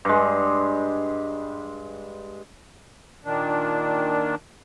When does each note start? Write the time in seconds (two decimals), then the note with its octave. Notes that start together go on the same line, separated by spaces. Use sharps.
0.05 G2 G#3
3.25 A#2 D#3 D4